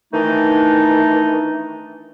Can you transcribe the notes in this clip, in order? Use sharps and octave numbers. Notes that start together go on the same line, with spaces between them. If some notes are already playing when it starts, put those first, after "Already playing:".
D#3 E3 A3 D4 D#4